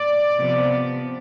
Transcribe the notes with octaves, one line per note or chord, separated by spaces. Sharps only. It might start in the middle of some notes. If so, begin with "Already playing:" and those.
Already playing: D5
C3 F3 B3